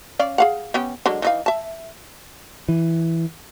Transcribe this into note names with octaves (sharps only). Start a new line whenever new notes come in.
C#4 D5 F5
G#4 F5 F#5
B3 C#4 G4
D3 F#3 G#3
E3 D#4 F5
E5 A5
E3